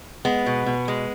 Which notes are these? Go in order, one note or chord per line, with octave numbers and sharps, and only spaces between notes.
G#3 B3
B2
B2
G#3